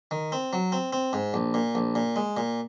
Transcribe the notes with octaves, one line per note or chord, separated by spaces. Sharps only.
D#3
C4
F#3
C4
C4
G#2
A#1
A#2
A#1
A#2
G#3
A#2